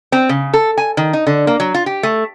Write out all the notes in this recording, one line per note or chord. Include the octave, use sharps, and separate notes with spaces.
C4
C#3
A4
G#5
D#3
D#4
D3
A#3
F#3
F4
G4
A3